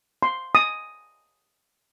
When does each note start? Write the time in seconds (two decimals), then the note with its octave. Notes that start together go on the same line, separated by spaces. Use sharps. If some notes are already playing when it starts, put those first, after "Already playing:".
0.23 C6
0.55 D#6